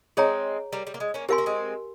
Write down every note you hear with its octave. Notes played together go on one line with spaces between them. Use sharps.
G#3 C4 G#4 C#5 G5 A#5
G3 A#3
G3
A#3
G#3
A#3 C#4
C4 G4 A#4 F5 G#5 C6
A#3
G#3 C4